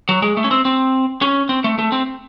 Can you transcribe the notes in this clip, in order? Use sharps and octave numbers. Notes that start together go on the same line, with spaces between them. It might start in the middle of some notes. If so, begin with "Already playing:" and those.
F#3
G#3
A3
C#4
C4
C4
C#4
C4
A3
A3
C4